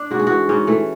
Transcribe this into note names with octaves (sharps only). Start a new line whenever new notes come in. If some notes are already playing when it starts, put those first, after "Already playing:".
Already playing: D4
G#2 F#4
G#4
E3 F#4
G#2 C#4
E3 A3